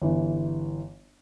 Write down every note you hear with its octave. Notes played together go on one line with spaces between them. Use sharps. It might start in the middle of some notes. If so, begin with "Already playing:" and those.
G1 E3